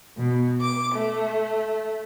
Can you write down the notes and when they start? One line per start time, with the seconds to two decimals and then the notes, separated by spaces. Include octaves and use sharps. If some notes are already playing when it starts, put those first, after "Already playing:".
0.18 B2
0.61 D6
0.95 A3